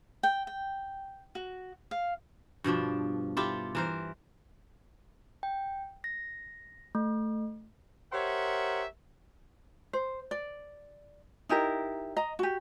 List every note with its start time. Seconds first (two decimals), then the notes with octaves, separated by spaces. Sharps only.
0.23 G5
0.47 G5
1.35 F#4
1.91 F5
2.64 G2 B2 F3 D4
3.37 E4 F4 G4 A4
3.75 E3 A#4 C5
5.43 G5
6.04 A#6
6.95 A3
8.13 G4 A#4 C5 C#5 E5 F#5
9.93 C5
10.31 D5
11.49 D#4 E4 G4 A#4
12.17 D#5 A#5
12.39 F#4 G4